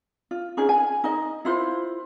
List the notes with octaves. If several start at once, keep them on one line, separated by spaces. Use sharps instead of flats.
F4
C#4 D#4 F4 G#4
G#5
D#4 D#5
E4 F4 C5